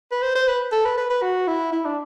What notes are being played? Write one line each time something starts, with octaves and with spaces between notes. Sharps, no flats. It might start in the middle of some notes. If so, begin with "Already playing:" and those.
B4
C5
C5
B4
A4
B4
B4
B4
F#4
E4
E4
D4